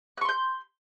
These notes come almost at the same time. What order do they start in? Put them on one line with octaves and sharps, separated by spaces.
F#6 C#6 C6 G6